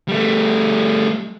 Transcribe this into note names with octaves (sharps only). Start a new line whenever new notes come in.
G3 A3